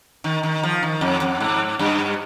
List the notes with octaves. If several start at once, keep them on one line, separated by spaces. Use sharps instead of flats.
D#3
D#3
F3
D#3
F2
F2
G#2
G2